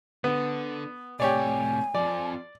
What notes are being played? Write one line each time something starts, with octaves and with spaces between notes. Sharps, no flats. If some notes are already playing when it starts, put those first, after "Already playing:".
D3 B3
A2 C3 G4 C#5 D5 G#5
F2 F3 D5